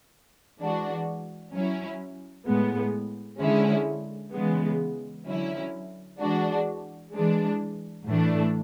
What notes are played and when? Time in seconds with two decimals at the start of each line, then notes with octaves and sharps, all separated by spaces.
0.59 E3 G#3 D4 F#4
1.52 F#3 C#4 E4
2.46 A2 G#3 B3
3.40 D3 G#3 C#4 E4
4.33 C#3 E3 G#3 B3
5.27 D3 F#3 C#4 E4
6.20 E3 G#3 D4 F#4
7.14 E3 G#3 D4
8.07 A2 E3 A3 D4